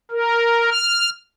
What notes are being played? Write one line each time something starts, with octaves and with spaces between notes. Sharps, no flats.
A#4
F6